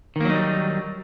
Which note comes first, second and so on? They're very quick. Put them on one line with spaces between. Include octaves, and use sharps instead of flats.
D#3 A#3 F#3 D#4 G3